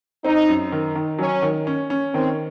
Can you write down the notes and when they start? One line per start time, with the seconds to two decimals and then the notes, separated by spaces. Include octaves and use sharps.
0.24 C4 D#4
0.48 F#2
0.72 D#3
0.95 D#3
1.18 F#3 C#4
1.42 D#3
1.67 C#4
1.90 C#4
2.14 D#3 C4